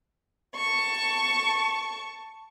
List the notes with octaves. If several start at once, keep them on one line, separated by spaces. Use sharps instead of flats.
A5 C#6